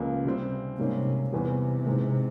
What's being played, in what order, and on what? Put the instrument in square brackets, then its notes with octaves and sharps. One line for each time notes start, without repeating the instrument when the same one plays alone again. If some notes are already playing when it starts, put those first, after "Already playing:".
Already playing: [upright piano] C#2 C#3 F3 A#3
C3 G3 C4
[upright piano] G#2 G3 A#3 C#4 [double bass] C3
[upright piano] E2 E3 G3 [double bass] C3
[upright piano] G#2 E3 G#3